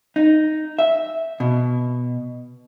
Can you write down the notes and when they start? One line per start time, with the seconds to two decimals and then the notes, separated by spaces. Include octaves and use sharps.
0.16 D#4
0.79 E5
1.40 B2